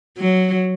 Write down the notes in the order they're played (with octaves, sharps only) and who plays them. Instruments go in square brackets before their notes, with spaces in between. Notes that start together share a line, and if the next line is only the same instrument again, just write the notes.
[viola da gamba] F#3